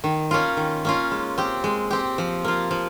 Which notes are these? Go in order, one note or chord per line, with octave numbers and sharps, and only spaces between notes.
D#3
A#3 C#4 F4
D#3
A#3 C#4 F4
G#3
C4 G4
G#3
C4 G4
F3
A#3 F4
F3